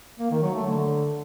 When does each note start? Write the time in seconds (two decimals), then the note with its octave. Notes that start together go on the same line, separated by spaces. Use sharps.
0.19 A#3
0.31 D#3
0.43 F#3
0.54 A3
0.66 D3